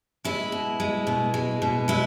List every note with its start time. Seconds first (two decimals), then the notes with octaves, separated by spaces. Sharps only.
0.25 G#3 E4
0.52 B2
0.80 G#3
1.07 B2
1.34 G#3
1.62 B2
1.88 G#3 E4